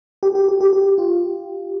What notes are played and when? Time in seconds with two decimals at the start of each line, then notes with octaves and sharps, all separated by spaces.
0.23 G4
0.35 G4
0.48 G4
0.61 G4
0.73 G4
0.98 F4